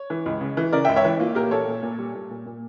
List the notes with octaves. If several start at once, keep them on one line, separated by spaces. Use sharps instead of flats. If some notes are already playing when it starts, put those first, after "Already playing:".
Already playing: C#5
E3
C#2
C#3
E3
C#3 A#4 D5
C#2 E5 G5
C#5 E5
E3
A#3 F4
A#2 G4 A#4
A#2 A4 C#5
A#2
A#2
G3
A#2
A#2
A#2